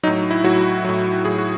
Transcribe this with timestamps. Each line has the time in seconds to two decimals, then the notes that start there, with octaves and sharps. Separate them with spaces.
0.03 F#3 D#4
0.07 A2
0.31 E4
0.44 A2 F#3 F#4
0.85 A2 F#3
1.25 A2 F#3 G#4
1.38 F#4